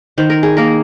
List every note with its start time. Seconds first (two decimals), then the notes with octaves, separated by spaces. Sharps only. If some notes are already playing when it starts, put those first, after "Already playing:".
0.18 D#3 C5
0.30 A#4
0.43 G#4
0.57 A#3 A#4